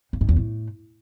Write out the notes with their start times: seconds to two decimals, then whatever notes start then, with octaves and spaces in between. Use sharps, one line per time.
0.13 G2
0.21 G#2
0.29 E2
0.36 A2